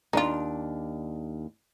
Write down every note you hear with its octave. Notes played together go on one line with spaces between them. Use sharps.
D#2 D4 D#4 F4